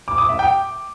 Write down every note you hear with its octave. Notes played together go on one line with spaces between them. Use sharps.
D6
D#6
E5
G5